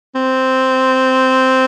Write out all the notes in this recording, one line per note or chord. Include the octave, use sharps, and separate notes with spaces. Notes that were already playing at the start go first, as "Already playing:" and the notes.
C4